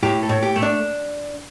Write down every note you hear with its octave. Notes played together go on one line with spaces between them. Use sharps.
A2 G4
A4
A2
G4
A3
D4